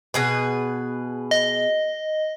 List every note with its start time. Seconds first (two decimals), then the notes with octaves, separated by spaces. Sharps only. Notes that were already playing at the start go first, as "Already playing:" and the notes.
0.14 B2 G#4 B4
1.31 D#5